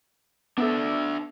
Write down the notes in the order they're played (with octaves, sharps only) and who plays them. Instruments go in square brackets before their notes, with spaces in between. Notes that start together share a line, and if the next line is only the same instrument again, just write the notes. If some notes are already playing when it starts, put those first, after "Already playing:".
[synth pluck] B3 A4 [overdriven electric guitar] D4 E5